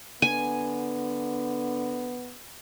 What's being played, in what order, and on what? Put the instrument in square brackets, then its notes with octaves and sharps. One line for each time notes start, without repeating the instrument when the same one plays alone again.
[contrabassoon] D3 [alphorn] B3 [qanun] G#5